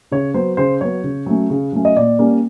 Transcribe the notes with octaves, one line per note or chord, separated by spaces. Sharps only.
C#3 C#5
F#3 B3 C5
C#3 C5
F#3 B3 C#5
C#3
F#3 A3 C#4
C#3
F#3 A3 C#4
D#5
A#2 D5
G3 A#3 C#4